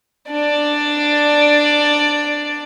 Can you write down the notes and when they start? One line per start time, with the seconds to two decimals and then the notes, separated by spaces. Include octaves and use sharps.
0.31 D4 D5